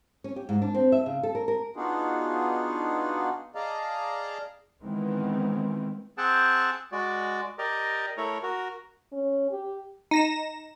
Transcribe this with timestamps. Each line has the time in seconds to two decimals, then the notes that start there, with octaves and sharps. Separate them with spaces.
0.24 C#4
0.36 G4
0.49 G#2
0.62 D4
0.75 C4
0.92 E5
1.06 C#3
1.23 A4
1.35 A#4
1.48 A#4
1.76 B3 D4 D#4 F4 F#4 G#4
3.55 G#4 D5 D#5 F5 A5 A#5
4.82 D#3 E3 G#3 B3 C4
6.18 C4 G#4 F#5 G5 A5
6.92 G#3 F#4 D5
7.58 G4 A#4 D5 D#5
8.17 A3 E4 A#4 C#5
8.43 F#4 A#4
9.12 C#4
9.51 G4
10.11 D#4 A#6 E7